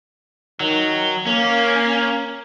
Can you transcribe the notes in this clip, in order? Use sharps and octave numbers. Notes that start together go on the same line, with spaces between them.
D#3 F#3
A#3 C#4